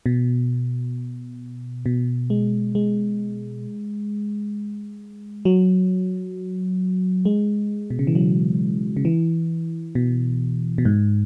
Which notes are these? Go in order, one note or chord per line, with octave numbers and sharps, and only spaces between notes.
B2
B2
G#3
G#3
F#3
G#3
B2
C#3
E3
F#3
C#3
E3
B2
B2
G#2